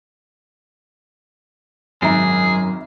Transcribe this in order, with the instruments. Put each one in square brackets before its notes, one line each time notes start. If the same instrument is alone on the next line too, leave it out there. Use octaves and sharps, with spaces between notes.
[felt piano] G#1 E5 A#5 [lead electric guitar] F#2 [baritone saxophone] G#4